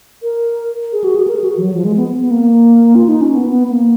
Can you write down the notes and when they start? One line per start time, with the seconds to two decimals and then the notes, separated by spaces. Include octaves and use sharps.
0.23 A#4
0.93 G#4
1.04 F#4
1.16 G#4
1.28 A#4
1.36 G#4
1.44 F#4
1.57 F3
1.62 F#3
1.74 F3
1.85 G#3
1.97 B3
2.20 B3
2.31 A#3
2.95 F4
3.08 D#4
3.21 C#4
3.35 B3
3.52 B3
3.70 A#3